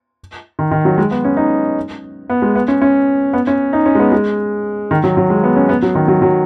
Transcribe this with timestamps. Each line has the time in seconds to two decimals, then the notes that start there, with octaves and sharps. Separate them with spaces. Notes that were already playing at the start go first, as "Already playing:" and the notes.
0.59 D#3
0.71 D#3
0.85 F#3
0.98 G#3
1.11 B3
1.25 C#4
1.37 D#4
2.30 B3
2.42 G#3
2.55 B3
2.68 C#4
2.82 C#4
3.33 B3
3.47 C#4
3.73 D#4
3.86 C#4
3.95 G#3
3.99 B3
4.12 G#3
4.91 D#3
5.04 F#3
5.17 F#3
5.30 G#3
5.44 B3
5.56 C#4
5.69 B3
5.82 F#3
5.95 D#3
6.08 F#3
6.22 F#3